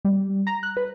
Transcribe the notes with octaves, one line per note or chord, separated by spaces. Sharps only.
G3
A#5
F#6
B4